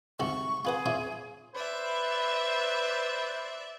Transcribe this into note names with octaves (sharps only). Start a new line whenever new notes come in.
C2 G#2 F#4 C#6
F4 G#4 B4 F#5
E4 F4 C#5
B4 C5 D5 E5